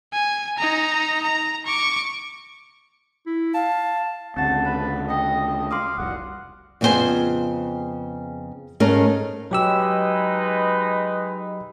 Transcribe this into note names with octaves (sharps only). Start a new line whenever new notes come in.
G#5
D#4 A#5
A#5
C#6 D6
E4
F5 A5
D2 C#3 C4 F#5 A5
B4 A5
D#5 G5 A5
D#5
F5 C6 D6 D#6
F1 C2 F#5
F2 C#3 B3 C#4 C5 G#5
G#2 A3 C#4 A#4
F#3 G#3 D#4 G4 B4 E6